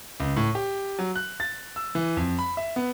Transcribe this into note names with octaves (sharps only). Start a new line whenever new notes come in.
C#2
A2
G4
F#3
F#6
A6
E6
E3
F2
B5
E5
B3